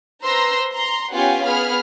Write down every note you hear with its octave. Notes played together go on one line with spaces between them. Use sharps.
B4 C5 A#5 C6 E6 A#6
A#5 C6
B3 C#4 F4 G4 F#5 G#5
B3 G#4 B5 F6